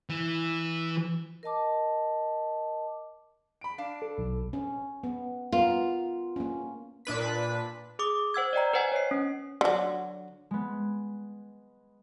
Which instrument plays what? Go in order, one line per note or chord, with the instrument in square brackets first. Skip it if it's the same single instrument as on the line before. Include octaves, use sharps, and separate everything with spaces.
[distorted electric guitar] E3
[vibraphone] A#4 D#5 A5 D6
[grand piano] B5 D7
[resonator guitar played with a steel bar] D4 F5
[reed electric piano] A4
[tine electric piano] B1
[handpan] C#4
B3
[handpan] B3 A#4 [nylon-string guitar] F4
[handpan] A#3 C#4
[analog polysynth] A#2 D4 B4 B6
[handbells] G#4 D6 D#6
C5 F#5 E6 G#6
D5 D#5 G5 A#5
B4 C5 D#5 F#5 G#5
C#5 C7
C#4
[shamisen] D3 F#3
[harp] G#3 B3